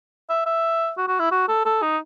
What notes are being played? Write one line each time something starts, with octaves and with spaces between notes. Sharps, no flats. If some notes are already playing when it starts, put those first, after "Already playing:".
E5
E5
F#4
F#4
E4
F#4
A4
A4
D#4